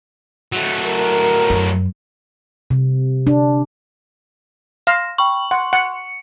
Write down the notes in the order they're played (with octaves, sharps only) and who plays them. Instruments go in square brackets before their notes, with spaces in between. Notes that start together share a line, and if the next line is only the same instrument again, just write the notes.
[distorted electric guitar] F#3 A3
[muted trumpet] A#4
[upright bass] F#2
[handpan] C3
D4
[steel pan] F5 [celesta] C6 A#6 E7
[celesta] G5 B5 [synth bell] C#6 F#7
[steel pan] F#5 [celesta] C6
[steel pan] F#5 [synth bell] C#7